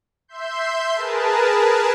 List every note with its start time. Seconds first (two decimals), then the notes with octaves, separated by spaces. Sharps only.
0.28 E5 C6 G6
0.94 G#4 A#4 B4 A5